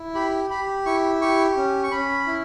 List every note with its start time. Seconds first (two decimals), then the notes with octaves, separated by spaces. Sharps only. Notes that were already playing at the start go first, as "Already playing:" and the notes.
Already playing: E4
0.15 G4 B5
0.50 G4 B5
0.86 E4 C#6
1.21 G4 C#6
1.56 C#4
1.84 C#6
1.91 C#4 B5
2.27 E4